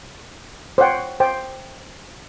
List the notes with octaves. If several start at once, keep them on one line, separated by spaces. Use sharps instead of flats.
C5 C#5 F#5 G5
C5 G5